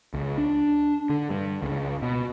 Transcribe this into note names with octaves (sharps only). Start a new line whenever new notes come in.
C#2
D4
D3
G2
C#2
B2